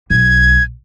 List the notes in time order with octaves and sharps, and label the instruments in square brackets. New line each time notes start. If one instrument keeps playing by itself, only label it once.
[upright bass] B1 [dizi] G#6